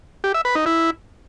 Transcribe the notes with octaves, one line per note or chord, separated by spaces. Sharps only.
G4
E5
B4
D#4
E4